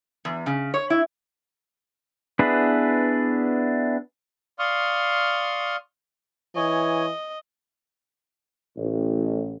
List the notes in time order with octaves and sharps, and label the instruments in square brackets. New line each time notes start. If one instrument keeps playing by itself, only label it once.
[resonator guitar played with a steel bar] E2
C#3
C#5
E4
[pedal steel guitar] B3 D4 E4 G#4 B4
[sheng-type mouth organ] D5 F5 C6 C#6 D#6 F6
[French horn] E3 [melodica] C#5 G#5 [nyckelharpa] D#5
[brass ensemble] A1